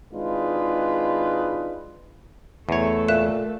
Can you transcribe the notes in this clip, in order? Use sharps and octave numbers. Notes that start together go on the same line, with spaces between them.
G#1 G#3 D4 D#4 F4 B4
E2 A3 A4 C#5
A#2 E5 F#6 E7